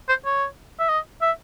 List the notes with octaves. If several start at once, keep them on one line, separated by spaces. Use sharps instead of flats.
C5
C#5
E5
D#5
E5